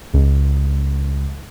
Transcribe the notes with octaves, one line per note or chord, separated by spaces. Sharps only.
C#2